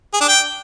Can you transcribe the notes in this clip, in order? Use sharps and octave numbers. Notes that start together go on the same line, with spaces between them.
G#4
D4
G5